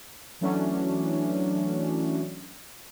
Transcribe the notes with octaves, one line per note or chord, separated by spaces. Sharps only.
E3 F#3 A3 C#4 D4